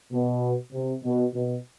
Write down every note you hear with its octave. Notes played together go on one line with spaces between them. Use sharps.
B2
C3
B2
B2